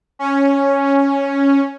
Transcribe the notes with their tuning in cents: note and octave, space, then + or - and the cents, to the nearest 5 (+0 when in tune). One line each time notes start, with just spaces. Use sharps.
C#4 +0